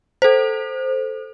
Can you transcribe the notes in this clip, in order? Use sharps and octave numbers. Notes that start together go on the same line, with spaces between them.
A4 C5